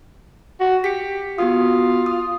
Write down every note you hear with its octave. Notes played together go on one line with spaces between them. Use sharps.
F#4
G4 B6 C#7
B3 F4 F#4 D#6
D#6